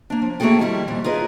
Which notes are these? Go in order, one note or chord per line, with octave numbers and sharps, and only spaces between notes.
A#3 D4
F3
A3 A#3 F#4 G#4 A4 G5
D#3 F3 G3 E4
F2 A#2 E3 G3
F4 G#4 A#4 B4 D#5